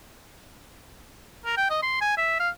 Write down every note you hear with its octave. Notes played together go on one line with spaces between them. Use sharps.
A#4
G5
D#5
C6
G#5
E5
F5